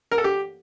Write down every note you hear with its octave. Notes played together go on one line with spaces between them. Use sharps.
A#4
A4
G4